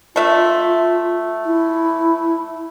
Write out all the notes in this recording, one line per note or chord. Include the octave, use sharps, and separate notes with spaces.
A3 F4 E5
E4